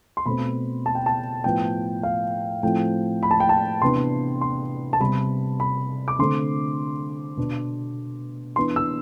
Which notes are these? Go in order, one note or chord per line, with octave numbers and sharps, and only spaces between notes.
C6
B2 A3 C4 B5
A5
G5
A5
A2 F3 B3 G5
F5
A2 F3 A3 C4 G5
B5
A5
G5
A5
C3 E3 B3 D4 C6
C6
A5
C3 G3 B3 B5
B5
D6
D3 A3 C4 C6
B2 B3 D4
E3 B3 D4 C6
E6